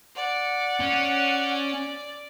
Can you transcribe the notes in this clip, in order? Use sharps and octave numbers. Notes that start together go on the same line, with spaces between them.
D5 F#5
C#4